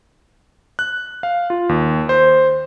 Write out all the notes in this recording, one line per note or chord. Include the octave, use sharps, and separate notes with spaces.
F#6
F5
F4
D#2
C5